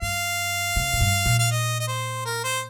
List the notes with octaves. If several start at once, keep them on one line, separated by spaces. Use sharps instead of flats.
G2 F5
C3
A#2
G2
A#2
F5
D#5
D#5
C5
A#4
C5